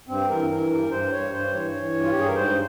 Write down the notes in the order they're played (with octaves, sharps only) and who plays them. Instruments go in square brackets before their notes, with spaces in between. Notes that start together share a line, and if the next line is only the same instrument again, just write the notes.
[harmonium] G2 C4
E3 A#4
E3 A#4
G2 A#4
G2 C5
G2 C#5
G2 C5
E3 C#5
E3
G2
F4
G4
G2 G#4
A#4
G#2 C5